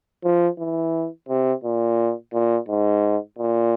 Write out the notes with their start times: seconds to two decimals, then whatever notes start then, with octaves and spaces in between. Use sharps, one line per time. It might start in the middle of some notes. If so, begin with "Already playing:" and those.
0.24 F3
0.59 E3
1.29 C3
1.64 A#2
2.34 A#2
2.69 G#2
3.39 A#2